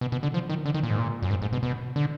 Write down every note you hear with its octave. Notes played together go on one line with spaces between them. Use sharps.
B2
B2
D3
F3
D#3
D3
D#3
A#2
G#2
A#2
F#2
G#2
G#2
B2
B2
D3